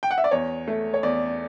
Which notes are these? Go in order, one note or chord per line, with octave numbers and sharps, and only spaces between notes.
G5
F#5
E5
D5
E2 C#5
A3
C#5
E2 D5